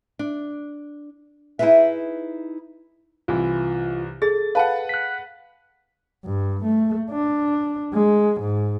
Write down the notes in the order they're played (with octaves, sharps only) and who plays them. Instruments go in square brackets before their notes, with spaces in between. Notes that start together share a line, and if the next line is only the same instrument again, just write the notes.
[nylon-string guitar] D4
D#4 E4 F#4 G#4 B4 E5
[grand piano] C2 E3 [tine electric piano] F4
[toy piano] G#4 [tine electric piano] A4 [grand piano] A6
[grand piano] B4 F#5 [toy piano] F5 A5
[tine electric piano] F#6 B6
[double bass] G2
A3
D4
G#3
G#2